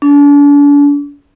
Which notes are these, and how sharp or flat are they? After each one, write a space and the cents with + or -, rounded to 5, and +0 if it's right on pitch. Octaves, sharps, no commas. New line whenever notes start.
D4 -40